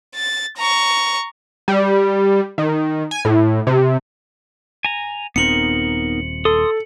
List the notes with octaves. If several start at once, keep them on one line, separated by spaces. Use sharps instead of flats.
A6
A#5 C#6
G3
D#3
G#5
A2
C3
G#5 A#5
D#1 B3 C4 D#4 A#4 C#7 F#7
A4 C6 D#6